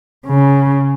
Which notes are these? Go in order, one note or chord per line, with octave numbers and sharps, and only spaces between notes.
C#3